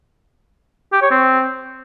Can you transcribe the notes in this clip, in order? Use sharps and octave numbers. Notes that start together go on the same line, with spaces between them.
G4
C#5
C4